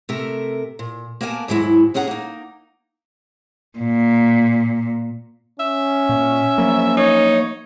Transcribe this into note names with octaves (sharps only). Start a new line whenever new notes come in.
C3 A3 A#4
A#2
A#3 B3 A#4 E5 G#5 A5
D#2 G#2 F#3 G#3 E4
F2 C#4 G#4 F#5 A#5
A#3 D#4
A#2
C#4 E5
A#2
F3 F#3 A#3
D#4 C#5